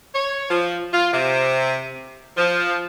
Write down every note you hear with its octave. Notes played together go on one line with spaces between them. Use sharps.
C#5
F3
F4
C3
F3